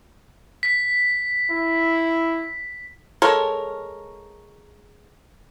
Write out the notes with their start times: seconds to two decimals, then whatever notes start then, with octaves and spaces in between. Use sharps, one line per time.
0.63 B6
1.51 E4
3.22 G#3 A4 A#4 C#5